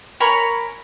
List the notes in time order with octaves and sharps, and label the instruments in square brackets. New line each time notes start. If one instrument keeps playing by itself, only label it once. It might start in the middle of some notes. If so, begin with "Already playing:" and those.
[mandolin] A#4 C#5 G#5 B5